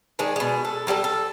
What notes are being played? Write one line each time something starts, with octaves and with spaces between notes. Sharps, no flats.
D#3 G#3 D4
B2 G#3
A4
F#3 G3 G4 A4
A4